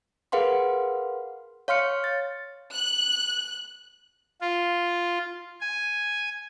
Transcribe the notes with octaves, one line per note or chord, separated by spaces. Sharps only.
G#4 A#4 B4 F5 F#5 C6
C#5 F5 C6 F6 C#7
A6
F#6
F4
G#5